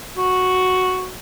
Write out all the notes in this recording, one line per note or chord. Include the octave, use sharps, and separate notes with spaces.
F#4